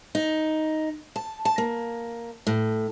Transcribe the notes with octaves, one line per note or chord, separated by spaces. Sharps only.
D#4
A5
A5
A#3
A2